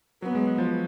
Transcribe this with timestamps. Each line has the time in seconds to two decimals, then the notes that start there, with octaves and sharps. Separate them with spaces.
0.22 F#3 B3
0.35 G#3
0.46 G#3
0.58 F3